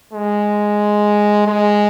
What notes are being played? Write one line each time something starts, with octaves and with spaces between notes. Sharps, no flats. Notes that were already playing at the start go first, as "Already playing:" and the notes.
G#3
G#3